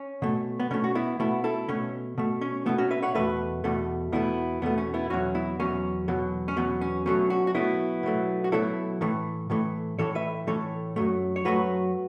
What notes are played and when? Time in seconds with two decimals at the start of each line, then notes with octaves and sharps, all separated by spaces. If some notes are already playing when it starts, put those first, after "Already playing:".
Already playing: C#4
0.22 B2 A3
0.60 B3
0.71 B2 A3 C#4
0.84 F#4
0.95 B3 E4
1.20 B2 A3 B3 E4
1.44 E4 A4
1.68 B2 A3 C#4
2.18 B2 A3
2.41 C#4
2.66 B2 A3 B3 E4
2.78 C#4 F#4
2.91 B4 E5
3.02 C#5 F#5
3.15 E2 B2 A3 B4 E5
3.64 E2 B2 A3
4.12 E2 B2 A3 B3 E4
4.62 E2 B2 A3 B3
4.78 C#4
4.94 B3 E4
5.10 E2 B2 F#3 C#4 F#4
5.34 B3 E4
5.60 E2 B2 F#3 C#4
6.08 E2 B2 F#3
6.48 C#4
6.56 E2 B2 F#3 B3
6.81 C#4
7.06 B2 F#3 A3 C#4
7.30 C#4 F#4
7.47 F#4
7.54 B2 F#3 A3 B3 E4
8.03 B2 F#3 A3
8.44 F#4
8.52 B2 F#3 A3 E4 A4
9.01 A2 E3 A3
9.50 A2 E3 A3
9.99 A2 E3 A3 A4 C#5
10.15 B4 E5
10.47 A2 E3 A3 A4 C#5
10.96 F#2 F#3 A3
11.36 C#5
11.45 F#2 F#3 A3 F#4 B4